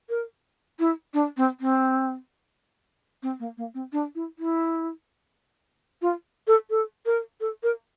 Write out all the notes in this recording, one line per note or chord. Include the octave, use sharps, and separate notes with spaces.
A#4
E4
D4
C4
C4
C4
A#3
A#3
C4
D4
E4
E4
F4
A4
A4
A#4
A4
A#4